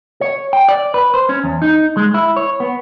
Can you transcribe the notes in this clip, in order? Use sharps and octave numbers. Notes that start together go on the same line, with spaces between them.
C#5
G5
D5
B4
C5
C#4
E2
D#4
G#3
E4
C#5
B3